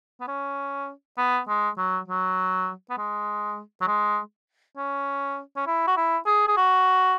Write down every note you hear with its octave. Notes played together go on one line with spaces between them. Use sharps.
B3
C#4
B3
G#3
F#3
F#3
B3
G#3
F#3
G#3
C#4
C#4
E4
F#4
E4
G#4
G#4
F#4